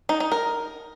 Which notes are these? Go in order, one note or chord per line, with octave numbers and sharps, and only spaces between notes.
D#4
D#4
A#4